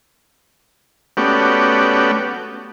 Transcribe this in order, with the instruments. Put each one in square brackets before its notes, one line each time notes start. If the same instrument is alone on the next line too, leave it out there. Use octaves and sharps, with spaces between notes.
[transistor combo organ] A3 B3 C#4 F#4 G4 D5